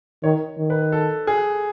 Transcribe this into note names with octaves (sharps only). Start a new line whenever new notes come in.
D#3 C#5
D#3
B4
A4
G#4